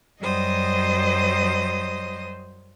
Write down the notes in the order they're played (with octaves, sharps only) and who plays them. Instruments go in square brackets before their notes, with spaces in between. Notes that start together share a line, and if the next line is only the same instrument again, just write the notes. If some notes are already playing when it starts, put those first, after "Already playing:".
[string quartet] F#2 F#3 G3 C5 D#5 D#6